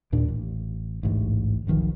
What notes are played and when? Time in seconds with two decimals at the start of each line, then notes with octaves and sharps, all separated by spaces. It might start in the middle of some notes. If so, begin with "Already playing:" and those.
0.12 D#2 A#2 D4
0.29 A1
1.03 A1 D2 G#2
1.67 E1 B1 D#3 F3